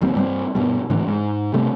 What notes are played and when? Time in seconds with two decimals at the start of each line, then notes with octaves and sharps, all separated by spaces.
0.01 F1 D#2 G3 C4
0.15 G2 G3 G#3 C4
0.55 G2 B2 G3
0.90 G#1 A2 D3 E3
1.07 G#2
1.54 C3 G3 A3 C4